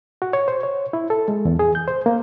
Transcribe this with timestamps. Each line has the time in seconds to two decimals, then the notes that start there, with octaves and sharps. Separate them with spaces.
0.22 F#4
0.33 C#5
0.48 C5
0.63 C#5
0.93 E4
1.10 A4
1.28 G#3
1.45 E2
1.59 G#4
1.75 G6
1.88 C5
2.06 A#3